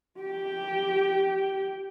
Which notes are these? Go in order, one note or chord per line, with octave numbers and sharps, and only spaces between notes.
G4 G5